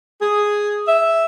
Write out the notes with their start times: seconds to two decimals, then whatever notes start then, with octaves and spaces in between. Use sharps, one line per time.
0.22 G#4
0.88 E5